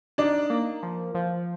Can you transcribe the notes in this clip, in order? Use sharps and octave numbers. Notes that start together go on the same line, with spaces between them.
D4 D#4 D5
A#3
F3
F3